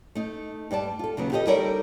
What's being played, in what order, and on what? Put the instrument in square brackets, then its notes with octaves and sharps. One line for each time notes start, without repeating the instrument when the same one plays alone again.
[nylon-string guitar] A3 D#4
G2 G3 D5 A5
F4 A4
D#2 C#3 F#3 B3
F4 G4 A4 C5 D#5
G3 D#4 A4 A#4 C#5 D5